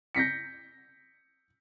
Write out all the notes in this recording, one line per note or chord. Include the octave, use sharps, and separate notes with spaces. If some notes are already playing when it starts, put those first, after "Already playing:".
G6 A#6 B6 C#7